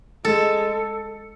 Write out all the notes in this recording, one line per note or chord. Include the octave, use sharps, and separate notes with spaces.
G#3 A4